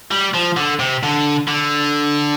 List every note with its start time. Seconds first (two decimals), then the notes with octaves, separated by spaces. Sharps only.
0.11 G3
0.34 F3
0.57 D3
0.80 C3
1.03 D3
1.48 D3